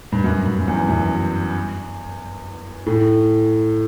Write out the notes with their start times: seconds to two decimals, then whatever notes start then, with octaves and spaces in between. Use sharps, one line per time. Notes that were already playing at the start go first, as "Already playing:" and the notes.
0.12 G2
0.24 F#2
0.45 G2
0.59 F#2
0.68 E2
0.89 F#2
2.86 A2